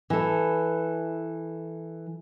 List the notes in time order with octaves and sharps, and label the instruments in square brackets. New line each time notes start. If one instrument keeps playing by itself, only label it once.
[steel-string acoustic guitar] E3 A4